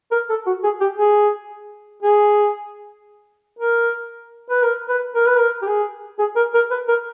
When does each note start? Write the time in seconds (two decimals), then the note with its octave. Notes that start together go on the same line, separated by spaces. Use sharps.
0.12 A#4
0.29 A4
0.47 F#4
0.64 G#4
0.81 G4
0.98 G#4
2.03 G#4
3.59 A#4
4.50 B4
4.63 A#4
4.89 B4
5.15 A#4
5.27 B4
5.39 A#4
5.62 G4
5.67 G#4
6.19 G#4
6.36 A#4
6.54 A#4
6.71 B4
6.88 A#4